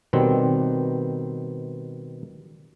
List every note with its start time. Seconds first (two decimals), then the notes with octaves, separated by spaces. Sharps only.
0.13 B2 D#3 G3 C4